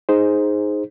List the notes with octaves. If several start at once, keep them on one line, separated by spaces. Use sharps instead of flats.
D#4 G#4 C5